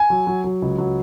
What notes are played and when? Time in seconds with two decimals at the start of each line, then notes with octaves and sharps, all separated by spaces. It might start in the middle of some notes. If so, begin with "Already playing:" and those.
Already playing: G#5
0.10 F#3
0.27 F#3
0.44 F#3
0.62 C#2
0.78 F#3